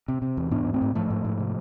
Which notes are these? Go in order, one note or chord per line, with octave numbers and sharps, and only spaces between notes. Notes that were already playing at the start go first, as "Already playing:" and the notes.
C3
C3
E2
G#2 B3 D4
G#2
A3 C4
G#2
G#2 F3 A3
G#2
G#2
C3